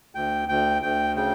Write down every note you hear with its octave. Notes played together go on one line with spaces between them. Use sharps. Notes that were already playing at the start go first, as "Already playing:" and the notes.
D2 G5
D2 G5
D2 G5
C#3 G5